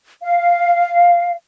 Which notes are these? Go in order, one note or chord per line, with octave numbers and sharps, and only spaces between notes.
F5